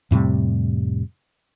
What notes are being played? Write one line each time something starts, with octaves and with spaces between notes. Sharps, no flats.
F2 A2 C3 G3